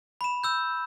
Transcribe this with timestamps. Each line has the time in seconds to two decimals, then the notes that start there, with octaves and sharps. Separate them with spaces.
0.21 B5 E7
0.44 E6 G6